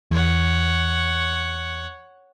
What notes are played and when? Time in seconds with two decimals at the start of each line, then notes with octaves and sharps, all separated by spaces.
0.11 E2 C#5 F#5